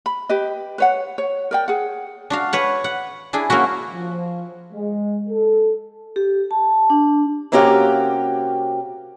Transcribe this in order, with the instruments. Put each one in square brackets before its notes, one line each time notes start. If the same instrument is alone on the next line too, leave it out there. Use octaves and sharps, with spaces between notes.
[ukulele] B5
G4 B4 D#5
B4 C#5 F#5
C#5
A#4 D5 G5
G#4 F#5
[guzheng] D4 F#4 F5
B4 C#5 F#5
F#5
D4 E4 G#4
A#3 C#4 E4 F#4
[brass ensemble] F3
G#3
A4
[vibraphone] G4
A5
D4
[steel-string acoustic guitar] C3 A#3 C#4 F#4 G4 F5